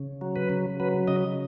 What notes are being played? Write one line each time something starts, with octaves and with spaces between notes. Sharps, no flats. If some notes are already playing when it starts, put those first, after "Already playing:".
Already playing: C#3
F#3
B4
C#3
F#3 B4
C#3 D#5